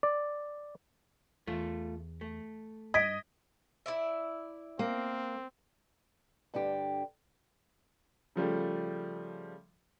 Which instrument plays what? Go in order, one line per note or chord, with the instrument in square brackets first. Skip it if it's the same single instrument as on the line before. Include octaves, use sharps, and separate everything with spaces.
[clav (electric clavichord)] D5
[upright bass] E2 [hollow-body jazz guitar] A3 F4
[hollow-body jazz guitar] A3
[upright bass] G2 [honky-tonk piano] D#5 [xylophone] G#6 B6 D7
[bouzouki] E4 D5 E5
[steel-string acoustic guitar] A#3 [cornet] C4
[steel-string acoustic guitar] G2 D3 D4 G4
[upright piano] C#3 F3 G3 A3